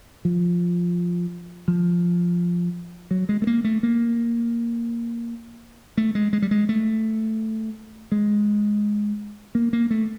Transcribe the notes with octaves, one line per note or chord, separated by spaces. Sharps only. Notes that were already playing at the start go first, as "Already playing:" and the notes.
F3
F3
F#3
G#3
A3
A#3
A3
A#3
A3
G#3
G#3
G3
G#3
A3
G#3
A#3
A#3
A3